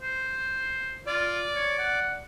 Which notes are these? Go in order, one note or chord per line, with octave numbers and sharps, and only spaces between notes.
C5
F4 D5
C#5
F#5